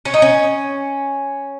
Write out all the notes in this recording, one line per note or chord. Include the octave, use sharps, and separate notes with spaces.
C#4
D#4
C#4